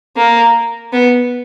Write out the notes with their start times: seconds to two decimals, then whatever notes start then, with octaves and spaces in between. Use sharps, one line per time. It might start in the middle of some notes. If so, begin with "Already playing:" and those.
0.17 A#3
0.93 B3